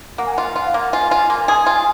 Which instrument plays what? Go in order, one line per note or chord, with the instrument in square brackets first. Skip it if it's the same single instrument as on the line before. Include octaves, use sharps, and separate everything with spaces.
[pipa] A#3 [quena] F#5
[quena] G#5
[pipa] F4 [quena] F#5
[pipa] F4
[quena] F5
[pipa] A#3
[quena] F#5
[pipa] F4 [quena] G#5
[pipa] F4
A#3
G#4
F4